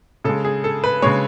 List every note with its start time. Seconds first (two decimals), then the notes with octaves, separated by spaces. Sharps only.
0.24 C#3 G#3 A4
0.45 G#4
0.64 A4
0.84 B4
1.02 C#3 G#3 C#5